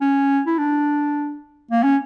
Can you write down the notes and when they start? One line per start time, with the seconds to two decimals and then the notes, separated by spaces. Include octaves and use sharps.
0.01 C#4
0.47 E4
0.58 D4
1.71 A#3
1.84 C#4